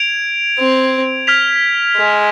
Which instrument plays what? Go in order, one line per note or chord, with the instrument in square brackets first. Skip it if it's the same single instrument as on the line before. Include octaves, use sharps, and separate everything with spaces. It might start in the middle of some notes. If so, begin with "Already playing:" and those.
Already playing: [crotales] G#6 D7 F7
[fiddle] C4
[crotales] F6 G#6 B6 F7
[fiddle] G#3